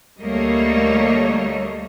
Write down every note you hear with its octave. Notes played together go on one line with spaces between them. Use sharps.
D2 G3 A3 A#3 C#5 D#5